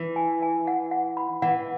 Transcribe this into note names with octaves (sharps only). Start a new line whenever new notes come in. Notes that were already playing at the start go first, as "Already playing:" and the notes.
Already playing: E3
G#5
G#5
F#5
F#5
B5
E3 F#5